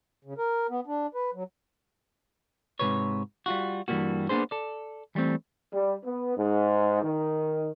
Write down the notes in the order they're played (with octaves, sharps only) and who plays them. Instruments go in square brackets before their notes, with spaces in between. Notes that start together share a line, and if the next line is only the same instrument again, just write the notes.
[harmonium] C#3
A#4
B3
D4
B4
F#3
[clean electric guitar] G#2 C3 D#3 E3 B4 C#5
G3 F4 F#4
G2 E3 F3 G3 A#3 F#4
A#3 B3 D4 G#4 C5
A4 D5
E3 G3 A3 C4
[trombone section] G3
B3
G#2
D#3